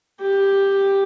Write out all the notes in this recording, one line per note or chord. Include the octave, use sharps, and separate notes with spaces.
G4